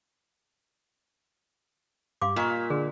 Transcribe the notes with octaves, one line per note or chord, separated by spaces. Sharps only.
G2 F5 C6 D6
A#2 D#5 C6 C#6 B6
D3 G#4